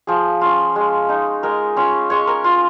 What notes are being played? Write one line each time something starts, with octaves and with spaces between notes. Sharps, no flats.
F3 G#4
C#4 F4
G#3
D#4
G#3 A#4
C#4 F4 C#5
G#3 C#5
A#4
F4